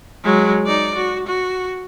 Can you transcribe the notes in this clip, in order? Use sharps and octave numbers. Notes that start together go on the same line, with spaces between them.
F#3 G#3
D#4 D5
F#4
F#4